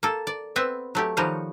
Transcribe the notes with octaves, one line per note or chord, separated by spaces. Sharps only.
A#3 A4
D5
B3 C4 B4 E5
F#3 A3 G4
D#3 F3 G3 D#4 F#4 C#5